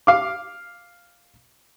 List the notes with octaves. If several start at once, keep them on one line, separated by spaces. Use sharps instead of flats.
F5 D6